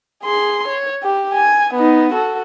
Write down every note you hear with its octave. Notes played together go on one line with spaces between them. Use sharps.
G#4 C6
C#5
G4
G#5
B3 D#4
F#4 A4